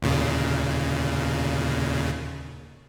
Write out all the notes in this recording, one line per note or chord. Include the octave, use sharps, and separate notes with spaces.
D#2 A#2 C#3